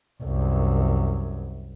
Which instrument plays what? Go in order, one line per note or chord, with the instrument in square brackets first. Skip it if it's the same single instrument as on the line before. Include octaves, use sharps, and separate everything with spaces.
[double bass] C2 F#2